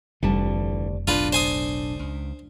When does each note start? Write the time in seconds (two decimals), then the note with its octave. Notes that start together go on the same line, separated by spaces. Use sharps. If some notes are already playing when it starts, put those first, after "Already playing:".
0.22 F1 D2 D3 E3 G3 A5
1.07 B1 A2 D4 F4 B4
1.33 C5 G#5 D#6
1.99 C#2